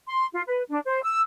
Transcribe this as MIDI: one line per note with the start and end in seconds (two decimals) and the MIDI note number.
0.07 0.26 84
0.33 0.42 65
0.47 0.62 71
0.69 0.79 62
0.85 1.00 72
1.02 1.20 88